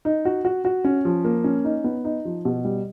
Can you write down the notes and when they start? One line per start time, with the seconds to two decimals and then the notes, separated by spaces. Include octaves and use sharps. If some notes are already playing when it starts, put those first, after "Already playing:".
0.05 D#4
0.25 F#4
0.45 F#4
0.65 F#4
0.85 C#4
1.05 F3
1.25 A#3
1.44 C#4
1.65 D#4
1.84 B3
2.05 D#4
2.25 F3
2.45 B2
2.65 G3